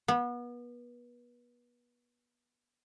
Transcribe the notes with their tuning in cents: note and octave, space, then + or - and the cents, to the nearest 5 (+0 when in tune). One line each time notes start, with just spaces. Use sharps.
B3 -30